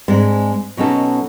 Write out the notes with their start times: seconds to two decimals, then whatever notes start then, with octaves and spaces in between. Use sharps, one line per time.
0.08 G#2 G#3 C4 D4
0.77 B2 F#3 B3 C#4 D#4 A4